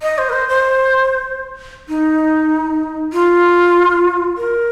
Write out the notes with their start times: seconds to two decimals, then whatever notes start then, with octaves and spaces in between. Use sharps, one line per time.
0.02 D#5
0.18 C5
0.29 A#4
0.33 C5
0.49 C5
1.89 D#4
3.13 F4
4.37 A#4